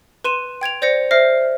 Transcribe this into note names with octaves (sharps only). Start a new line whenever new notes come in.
B4 C6 D#7 E7
G5 G#6 D7 F7
C5 D5 G6 A#6 C#7
C5 E5 F6 A#6 C7